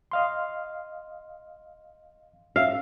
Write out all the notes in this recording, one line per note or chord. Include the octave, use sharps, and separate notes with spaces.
D#5 F5 C6
C#4 E5 F5